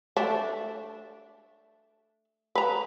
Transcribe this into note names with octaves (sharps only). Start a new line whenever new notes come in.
A3 D4
B4 A#5